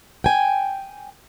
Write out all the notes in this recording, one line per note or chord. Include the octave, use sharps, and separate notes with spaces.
G5 G#5